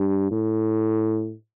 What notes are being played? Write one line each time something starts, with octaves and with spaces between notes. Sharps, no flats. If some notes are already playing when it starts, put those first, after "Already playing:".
Already playing: G2
A2